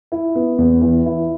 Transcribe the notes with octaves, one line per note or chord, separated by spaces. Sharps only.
E4
B3
E2
E3
E4